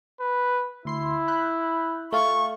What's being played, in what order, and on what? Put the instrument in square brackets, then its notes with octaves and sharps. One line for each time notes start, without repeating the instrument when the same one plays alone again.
[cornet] B4
[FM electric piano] D2 C6 C7 [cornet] E4
[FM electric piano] B5 F#6 G6
[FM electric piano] A3 F4 [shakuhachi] C#6